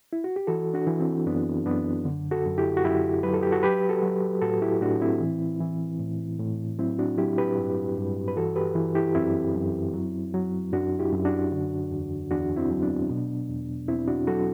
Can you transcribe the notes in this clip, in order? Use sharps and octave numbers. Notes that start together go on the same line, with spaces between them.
E4
F#4
G4
E3 F#4 A4
D4 F#4
E3
C4 E4
F#2 B3 D4
F#2 B3 D4
D3
F#4 A4
F#2
E4 G4
F#4
F#2 E4 G4
F#3 B4
A4
G4
F#4 A4
F#3 G4 B4
F#4 A4
F#3
A2 F#4 A4
E4 G4
A2 D4 F#4
C4 E4
E3
E3
A2
A2
F#3 C4 E4
D4 F#4
F#3 E4 G4
G4 B4
G2
G2
B4
E3 F#4 A4
G4 B4
E3
E4 G4
F#2 C4 E4
F#2
F#3
F#3
F#2 D4 F#4
E4 G4
F#2
D4 F#4
D3
E2
E2 D4 F#4
C4 E4
F#3
B3 D4
B2
E2
E2 C4 E4
D4 F#4
F#3 F#4 A4